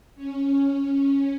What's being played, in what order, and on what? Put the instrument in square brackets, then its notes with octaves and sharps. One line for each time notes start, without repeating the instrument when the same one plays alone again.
[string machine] C#4